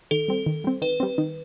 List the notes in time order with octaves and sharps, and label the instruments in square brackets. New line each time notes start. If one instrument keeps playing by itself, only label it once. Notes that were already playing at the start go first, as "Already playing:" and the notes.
[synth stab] D#3 [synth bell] A4
[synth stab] G3 C4
D#3
G3 C4
[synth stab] D#3 [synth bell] B4
[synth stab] G3 C4
D#3